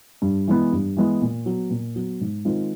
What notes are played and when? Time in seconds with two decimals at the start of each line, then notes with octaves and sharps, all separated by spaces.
0.22 G2
0.48 E3 G#3 B3
0.72 G2
0.97 E3 G#3 B3
1.21 A#2
1.46 F#3 B3
1.70 A#2
1.96 F#3 B3
2.21 G#2
2.45 D#3 G#3 C4 F4